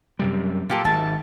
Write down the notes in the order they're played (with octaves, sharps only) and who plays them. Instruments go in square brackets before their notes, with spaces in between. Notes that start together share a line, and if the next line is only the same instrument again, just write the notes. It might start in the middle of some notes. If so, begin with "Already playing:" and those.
[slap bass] F#2 C3 G3
[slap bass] A#2 [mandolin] F4 G4 A4
[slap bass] G#1 G#2 [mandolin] E5 A5